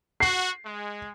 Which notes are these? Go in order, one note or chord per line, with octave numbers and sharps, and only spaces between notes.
F#4 C7
G#3